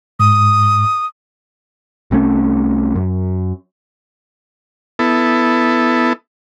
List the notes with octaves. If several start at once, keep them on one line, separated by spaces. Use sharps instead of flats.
G#2 D#6
C2 C3 A3 C#4
F#2
B3 E4 A4